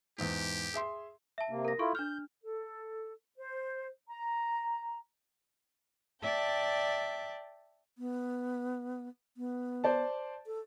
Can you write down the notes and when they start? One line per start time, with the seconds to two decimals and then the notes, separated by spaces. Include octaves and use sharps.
0.18 E2 G#2 G4
0.74 G#4 E5 C6
1.38 E5 A5
1.50 C3 A#3
1.65 A#4 A#6
1.79 E4 F4 A4 C#6
1.95 D4 F6 G6
2.43 A4
3.38 C5
4.09 A#5
6.22 D5 E5 G5 A5
7.98 B3
9.37 B3
9.84 C5 D5 A5
10.46 A4